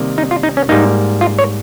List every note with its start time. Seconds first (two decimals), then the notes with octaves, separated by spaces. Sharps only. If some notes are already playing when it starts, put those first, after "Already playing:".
Already playing: C3 D#3 G3 A#3
0.18 D#4
0.31 F4
0.43 D#4
0.57 C#4
0.69 G#2 G3 A#3 D#4
1.21 F4
1.39 C#5